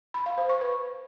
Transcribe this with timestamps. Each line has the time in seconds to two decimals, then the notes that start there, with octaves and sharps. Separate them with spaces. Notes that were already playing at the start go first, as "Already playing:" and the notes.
0.14 B5
0.26 F5
0.38 C5
0.49 C#6
0.61 B4